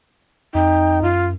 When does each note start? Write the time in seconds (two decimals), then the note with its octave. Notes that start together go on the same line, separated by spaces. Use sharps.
0.55 F2 D#4 G5
1.02 F#2 F4